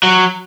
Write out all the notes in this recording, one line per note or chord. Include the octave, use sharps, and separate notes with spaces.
F#3